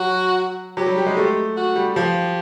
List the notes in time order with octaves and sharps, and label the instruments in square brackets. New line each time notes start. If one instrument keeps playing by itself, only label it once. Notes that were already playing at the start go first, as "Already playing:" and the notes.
Already playing: [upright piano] F#3 [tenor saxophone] F#4
[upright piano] F#3 [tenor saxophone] G4
[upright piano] G3
G3
G#3
A3
[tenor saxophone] F#4
[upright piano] G3
[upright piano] F3 [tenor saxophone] G4